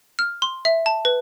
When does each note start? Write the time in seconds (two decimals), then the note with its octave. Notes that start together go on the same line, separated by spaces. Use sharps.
0.19 F6
0.42 C6
0.65 E5
0.86 A5
1.05 B4